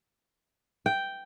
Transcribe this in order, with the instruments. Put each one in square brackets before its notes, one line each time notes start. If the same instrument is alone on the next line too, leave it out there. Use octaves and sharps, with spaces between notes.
[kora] G5